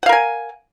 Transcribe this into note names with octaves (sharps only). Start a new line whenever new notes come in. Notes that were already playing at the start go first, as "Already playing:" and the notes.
A#4 F5 F#5 G#5